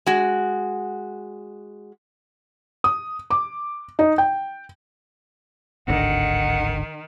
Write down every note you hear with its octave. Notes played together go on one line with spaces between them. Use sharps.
G#3 F#4
D#6
D6
D#4
G5
D1 G#1 D3 D#3 F#5